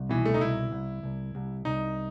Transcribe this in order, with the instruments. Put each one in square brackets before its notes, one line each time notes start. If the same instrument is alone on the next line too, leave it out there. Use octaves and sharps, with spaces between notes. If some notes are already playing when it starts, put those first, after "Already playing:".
Already playing: [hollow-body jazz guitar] C2
[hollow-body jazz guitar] B2 [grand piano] E3
[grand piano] A3
D#4
[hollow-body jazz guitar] C2 [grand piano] E4
[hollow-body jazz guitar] C2
C2
C2
[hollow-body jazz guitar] C2 [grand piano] D#4